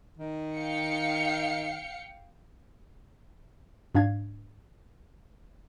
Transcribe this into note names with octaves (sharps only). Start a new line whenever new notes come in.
D#3
F5 G5 C#7
G#2 D4 F5 G#6